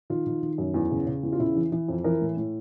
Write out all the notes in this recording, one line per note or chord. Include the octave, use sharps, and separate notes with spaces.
D#3 F4
D#3
D#3
F#2
E2
C#3
C#3
E2
F4
C#3 E4
E3
E3
F2
E3 A#4
A2
A2